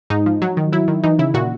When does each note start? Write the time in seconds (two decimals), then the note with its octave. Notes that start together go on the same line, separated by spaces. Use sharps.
0.10 G#2 D#4
0.26 F3
0.42 F#3
0.57 D#3
0.72 F#3 E4
0.88 D#3
1.04 E3 D#4
1.19 C#3 E4
1.34 A#2 F#4